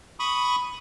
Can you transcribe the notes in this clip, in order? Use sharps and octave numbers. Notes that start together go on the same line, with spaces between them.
B5 C#6 D#6